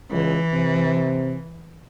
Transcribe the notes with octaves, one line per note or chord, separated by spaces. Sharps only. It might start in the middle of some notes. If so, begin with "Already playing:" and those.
C#2 E3
C3